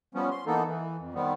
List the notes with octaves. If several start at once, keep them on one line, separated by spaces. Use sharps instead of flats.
F3 G3 B3 C#4
C6
E3 A#3 B3 D#4 A4
E3
F2
D#3 G3 B3 C4